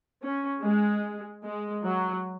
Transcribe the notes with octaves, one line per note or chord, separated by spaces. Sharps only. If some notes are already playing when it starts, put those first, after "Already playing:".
C#4
G#3
G#3
F#3